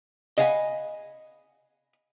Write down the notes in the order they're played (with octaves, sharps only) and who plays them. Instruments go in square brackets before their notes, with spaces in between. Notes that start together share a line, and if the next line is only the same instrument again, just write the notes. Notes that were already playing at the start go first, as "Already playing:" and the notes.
[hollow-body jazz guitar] D#5 F5 F#5 G#5 A#5 B5